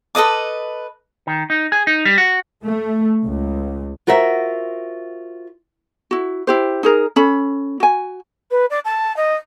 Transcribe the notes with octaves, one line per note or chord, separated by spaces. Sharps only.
A4 B4 D#5 D6
D#3
D#4
G#4
D#4
G3
F#4
A3
C#2
F4 F#4 A#4 C5 E5
E4 F#4
E4 G4 C5
D#4 G#4 A#4
C#4 A4 B5
F#4 G#5
B4
D5
A5
D#5